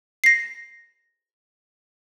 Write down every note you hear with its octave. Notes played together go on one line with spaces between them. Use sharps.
A#6 C7